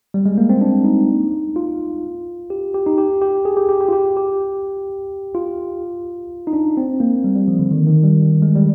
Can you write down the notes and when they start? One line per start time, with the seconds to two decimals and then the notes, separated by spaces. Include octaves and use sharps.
0.14 G3
0.26 G#3
0.38 A#3
0.50 C4
0.61 D4
0.84 D#4
1.56 F4
2.50 G4
2.74 G4
2.86 D#4
2.98 G4
3.22 G4
3.45 G#4
3.57 G4
3.69 G4
3.81 G4
3.89 F4
3.93 G4
4.17 G4
5.35 F4
6.47 D#4
6.53 D4
6.77 C4
7.00 A#3
7.24 G3
7.36 G3
7.48 F3
7.59 D3
7.71 D#3
7.87 D#3
8.03 G3
8.42 G#3
8.55 G3